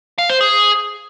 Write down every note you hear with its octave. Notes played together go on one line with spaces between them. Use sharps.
F5
C5
G#4